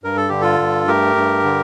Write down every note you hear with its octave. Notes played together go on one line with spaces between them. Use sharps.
G2 A#4
A4
D3 G4
F4 A4
G2
A3 G4 A#4
G2
D3